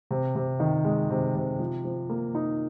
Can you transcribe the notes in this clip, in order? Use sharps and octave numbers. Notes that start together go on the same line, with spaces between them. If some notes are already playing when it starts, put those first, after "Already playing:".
C3
C3
D#3
G#3
C3
C3
F3
F3
A#3
D#4